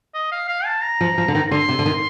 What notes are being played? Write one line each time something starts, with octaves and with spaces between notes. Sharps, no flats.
D#5
F5
F5
A5
A#5
F3
F3
D3
D#3
D3 C6
C3
D3
D#3